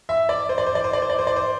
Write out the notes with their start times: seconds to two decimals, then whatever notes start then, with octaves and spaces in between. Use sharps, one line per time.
0.09 E5
0.29 D5
0.49 C5
0.58 D5
0.66 C5
0.75 D5
0.84 C5
0.93 D5
1.02 C5
1.10 D5
1.19 C5
1.27 D5
1.36 C5